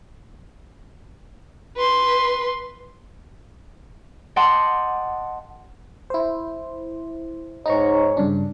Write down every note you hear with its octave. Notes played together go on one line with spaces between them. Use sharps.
B4 C6
D#5 F#5 G5 A5 C6 D6
E4 C5
G#2 D#4 C#5 A#5 C#6
G2 C#3 D4